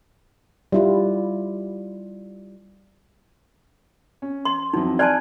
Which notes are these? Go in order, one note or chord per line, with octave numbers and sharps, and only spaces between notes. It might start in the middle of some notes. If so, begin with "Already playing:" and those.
G3 E4 F4
C#4
C6
F2 E3 F#3 D#4
D5 G#5 A5 C6 F6 F#6